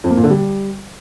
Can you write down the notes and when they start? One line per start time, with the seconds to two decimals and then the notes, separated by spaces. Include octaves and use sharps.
0.04 F2
0.11 A#3
0.17 A#2
0.24 D3
0.30 G3